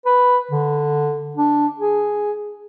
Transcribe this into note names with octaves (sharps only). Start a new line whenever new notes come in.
B4
D3
D4
G#4